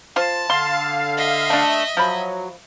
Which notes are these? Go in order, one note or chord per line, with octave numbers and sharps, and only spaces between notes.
F4 C5 A5
D3 F5 C6
D#5 E5
A3 D4
F3 F#3 B5